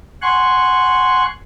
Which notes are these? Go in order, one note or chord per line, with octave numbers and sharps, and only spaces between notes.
F#5 G#5 C6 C#6 F#6